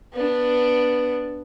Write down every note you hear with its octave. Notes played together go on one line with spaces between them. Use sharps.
B3 D4